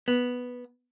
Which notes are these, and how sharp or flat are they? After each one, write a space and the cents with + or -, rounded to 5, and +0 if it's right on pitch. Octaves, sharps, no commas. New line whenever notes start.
B3 -5